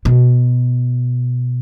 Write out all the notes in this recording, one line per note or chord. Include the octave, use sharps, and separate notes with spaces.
B2